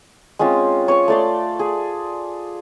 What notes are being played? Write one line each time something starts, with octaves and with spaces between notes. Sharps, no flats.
G#3 C4 C#4 F4
C#5 G#5 C#6
A3 D5 C6
G#4